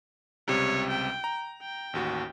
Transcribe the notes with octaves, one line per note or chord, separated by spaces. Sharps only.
C#2 C3 G3 C#5
G5
A#5
G5
A1 D#2 F#4